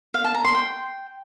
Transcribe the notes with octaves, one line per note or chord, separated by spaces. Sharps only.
F5
A5
A#5
C6
G5